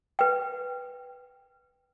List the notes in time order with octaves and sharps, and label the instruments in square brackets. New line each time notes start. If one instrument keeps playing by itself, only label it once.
[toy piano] B4 G5